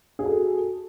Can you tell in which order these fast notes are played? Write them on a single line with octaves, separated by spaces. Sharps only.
G#4 F#4 A4